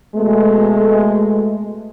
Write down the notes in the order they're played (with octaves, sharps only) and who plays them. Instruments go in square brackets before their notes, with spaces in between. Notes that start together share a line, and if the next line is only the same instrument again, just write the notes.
[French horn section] B2 G#3 A3